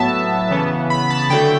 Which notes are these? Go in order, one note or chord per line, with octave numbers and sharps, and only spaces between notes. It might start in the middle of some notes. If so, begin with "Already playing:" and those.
Already playing: A2 F#3 B3 E5 A5
C#3 E3 B3
B5
A5
D3 F#3 A3 G5